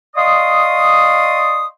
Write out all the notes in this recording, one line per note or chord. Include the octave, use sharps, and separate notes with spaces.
D5 D#5 F5 C6 C#6 D#6